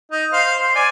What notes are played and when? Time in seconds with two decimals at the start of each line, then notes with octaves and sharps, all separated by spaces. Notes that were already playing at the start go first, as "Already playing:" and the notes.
0.12 D#4
0.33 C5 F5
0.59 C5
0.75 D5 G#5